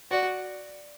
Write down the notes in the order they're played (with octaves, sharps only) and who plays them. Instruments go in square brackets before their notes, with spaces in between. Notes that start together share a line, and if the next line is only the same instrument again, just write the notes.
[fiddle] F#4 [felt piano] D5